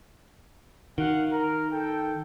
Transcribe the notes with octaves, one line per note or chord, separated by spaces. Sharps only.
D#3 F#4 F5 F#5
A#4
A4 G5